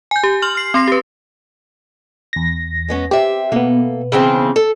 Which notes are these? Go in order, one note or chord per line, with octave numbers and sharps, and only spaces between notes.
G#5 G6
G4
C6 F6 F#7
F6 C7
C4 C6 A#6 C7
G4 B4
E2 A#6
G#3 B3 C#4
C4 G4 E5
B2 A#3 B3 A4
C#3 E3 C4 G#4 C5 A5
A4